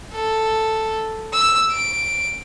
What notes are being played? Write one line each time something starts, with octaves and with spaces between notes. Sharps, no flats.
A4
E6
D7